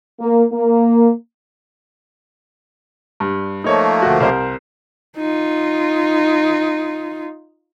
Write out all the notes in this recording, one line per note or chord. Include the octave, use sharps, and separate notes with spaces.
A#3
A#3
G2
F3 A3 A#3 D#4 C#5
D2 F#4
C2 A#4 C5
D#4 F4